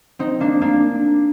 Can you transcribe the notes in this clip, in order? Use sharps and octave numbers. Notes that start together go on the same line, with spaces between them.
C4 D#4
A#3 D4
A#3 D4